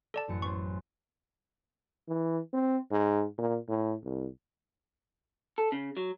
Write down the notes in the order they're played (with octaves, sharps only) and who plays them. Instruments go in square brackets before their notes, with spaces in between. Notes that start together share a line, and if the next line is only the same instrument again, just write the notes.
[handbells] A4 D5 A5
[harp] A1 F#2 C#7
[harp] B3 C#4 C5 [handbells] C#6
[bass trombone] E3
C4
G#2
A#2
A2
C2
[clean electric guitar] A4
C#3
F#3